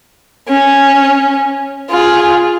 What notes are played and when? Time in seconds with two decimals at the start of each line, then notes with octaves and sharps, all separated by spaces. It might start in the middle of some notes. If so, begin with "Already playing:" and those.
0.48 C#4
1.91 F4 G#4